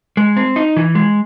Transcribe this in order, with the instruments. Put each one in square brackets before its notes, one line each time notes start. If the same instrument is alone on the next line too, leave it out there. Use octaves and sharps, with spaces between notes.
[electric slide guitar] G#3
C4
D#4
E3
G#3